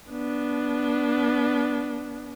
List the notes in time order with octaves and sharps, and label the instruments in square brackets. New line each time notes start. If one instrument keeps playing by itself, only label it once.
[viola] B3 D4